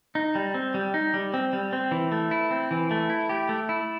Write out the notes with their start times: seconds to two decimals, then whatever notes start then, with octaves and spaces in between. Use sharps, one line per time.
0.15 D#4
0.35 G3
0.54 C4
0.74 G3
0.94 D#4
1.14 G3
1.34 C4
1.53 G3
1.73 C4
1.91 E3
2.12 A3
2.31 E4
2.51 C4
2.71 E3
2.91 A3
3.10 E4
3.29 G4
3.49 A3
3.69 E4